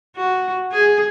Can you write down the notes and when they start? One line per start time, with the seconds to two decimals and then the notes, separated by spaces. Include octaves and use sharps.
0.16 F#4
0.72 G#4